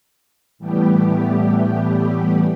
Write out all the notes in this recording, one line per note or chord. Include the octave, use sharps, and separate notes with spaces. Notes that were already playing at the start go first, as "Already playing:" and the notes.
A2 E3 G3 A3 B3 G4